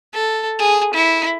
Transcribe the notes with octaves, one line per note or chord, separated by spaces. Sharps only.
A4
G#4
E4